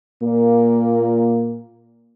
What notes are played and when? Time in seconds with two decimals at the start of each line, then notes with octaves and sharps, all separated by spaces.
0.23 A#2 A#3